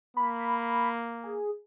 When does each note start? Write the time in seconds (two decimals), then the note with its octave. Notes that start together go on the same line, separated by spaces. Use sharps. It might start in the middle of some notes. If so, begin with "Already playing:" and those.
0.17 A#3 B5
1.24 G#4